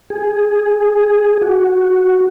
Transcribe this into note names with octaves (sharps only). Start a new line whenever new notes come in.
G#4
F#4